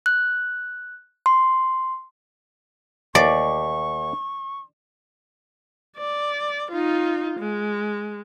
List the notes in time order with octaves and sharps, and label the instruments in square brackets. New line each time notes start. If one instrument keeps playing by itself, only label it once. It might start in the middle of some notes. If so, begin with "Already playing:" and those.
[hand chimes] F#6
C6
[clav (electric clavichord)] D#2 [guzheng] D5 [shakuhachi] C#6
[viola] D5
D#4 F4
G#3